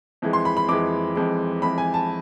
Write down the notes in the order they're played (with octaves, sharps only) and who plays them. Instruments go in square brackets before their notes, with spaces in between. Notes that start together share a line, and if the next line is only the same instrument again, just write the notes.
[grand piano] F2 E3 G#3
C6
B5
B5
F2 E3 G#3 D6
F2 E3 G#3
F2 E3 G#3 B5
G#5
A5